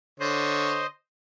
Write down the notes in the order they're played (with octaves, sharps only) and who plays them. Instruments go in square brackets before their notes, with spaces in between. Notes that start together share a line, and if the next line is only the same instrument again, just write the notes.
[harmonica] D3 C#5 [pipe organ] C5 D#5